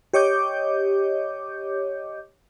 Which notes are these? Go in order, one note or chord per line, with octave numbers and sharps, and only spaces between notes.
G4 C#5 D#5 D6 G6